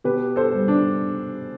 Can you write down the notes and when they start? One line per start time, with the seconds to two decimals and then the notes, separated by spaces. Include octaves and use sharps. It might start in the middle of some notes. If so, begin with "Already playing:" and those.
0.04 B2 G4 B4
0.36 A4 C5
0.52 G3
0.68 D4